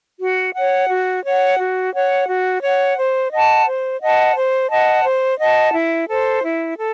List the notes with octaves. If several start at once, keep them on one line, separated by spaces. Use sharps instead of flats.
F#4
C#5 F#5
F#4
C#5 F#5
F#4
C#5 F#5
F#4
C#5 F#5
C5
D#5 F#5 A5
C5
D#5 F#5 A5
C5
D#5 F#5 A5
C5
D#5 F#5 A5
E4
A4 C5
E4
A4